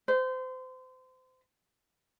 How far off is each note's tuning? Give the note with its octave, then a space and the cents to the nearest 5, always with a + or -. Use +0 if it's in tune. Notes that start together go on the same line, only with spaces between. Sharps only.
C5 -30